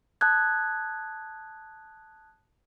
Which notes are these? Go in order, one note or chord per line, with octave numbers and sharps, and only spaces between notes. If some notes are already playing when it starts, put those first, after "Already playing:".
A5 D#6 F#6 G#6